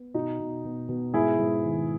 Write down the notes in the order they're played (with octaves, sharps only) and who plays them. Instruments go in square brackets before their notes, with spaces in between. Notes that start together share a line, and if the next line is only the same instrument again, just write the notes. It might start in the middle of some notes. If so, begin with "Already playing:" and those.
Already playing: [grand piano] B3
B2 D#4 F#4
B2
B2
B2
G#2 E4 G#4
G#2
D#3